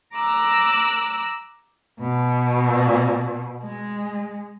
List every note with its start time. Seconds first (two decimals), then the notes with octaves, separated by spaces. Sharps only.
0.14 A#5 D6 E6 F#6
2.00 B2
3.63 G#3